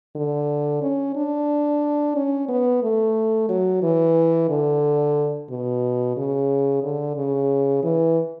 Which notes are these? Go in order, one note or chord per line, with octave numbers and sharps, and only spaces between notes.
D3
C#4
D4
C#4
B3
A3
F#3
E3
D3
B2
C#3
D3
C#3
E3